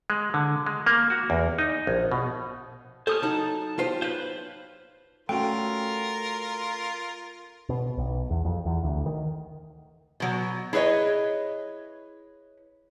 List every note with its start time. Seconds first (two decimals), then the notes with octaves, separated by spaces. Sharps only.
0.10 G#3
0.34 D3
0.67 G#3
0.86 A#3
1.10 F#4
1.30 E2
1.59 D#4
1.87 A#1
2.11 B2
3.07 A4 C5 G#5 A5 C#6 D#6 F6
3.22 F#3 D#4 F#5 A5
3.79 F4 G4 C5
4.02 B4 C5 F5
5.29 A3 C#4 F4 F#4 A#4 G5
7.69 B2
7.97 B1
8.30 E2
8.45 F2
8.65 E2
8.83 D2
9.06 D#3
10.20 B2 F#3
10.73 E4 G#4 B4 C#5 D#5